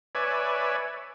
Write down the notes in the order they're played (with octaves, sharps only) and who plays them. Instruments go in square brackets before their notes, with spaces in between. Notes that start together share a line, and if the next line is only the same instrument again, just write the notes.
[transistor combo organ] B4 C#5 D5 E5 G#5